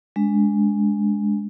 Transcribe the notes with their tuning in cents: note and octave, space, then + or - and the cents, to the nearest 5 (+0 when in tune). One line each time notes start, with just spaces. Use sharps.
G#3 +0 D4 -20